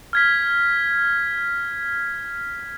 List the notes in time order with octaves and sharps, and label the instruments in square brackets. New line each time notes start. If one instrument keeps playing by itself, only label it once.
[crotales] F6 G#6 B6